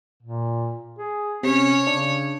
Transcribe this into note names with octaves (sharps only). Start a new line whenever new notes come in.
A#2
G#4
C3 C#4 C#5
C#3 D4